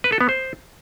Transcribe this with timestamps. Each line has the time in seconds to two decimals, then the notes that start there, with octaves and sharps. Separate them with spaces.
0.04 B4
0.12 A4
0.21 B3
0.29 C5